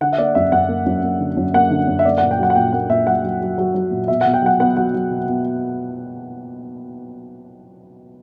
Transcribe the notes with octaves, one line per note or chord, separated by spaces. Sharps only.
D3 F#5
E5
A#3 D5
F#2 E5
F#2 F#5
A#3
F#2
A#3
D3
F#2
A#3 F#5
D3
F#2
E5
A#3 D5
A#2 F#5
G5
F#3 F#5
F#5
A#2 G5
A#3 F#5
A#2 E5
F#3 F#5
F#3
F#3
F#3
F#3
A#2
B2 E5
B2 F#5
G5
F#3 F#5
B3 F#5
F#3 F#5
F#3
B2
B2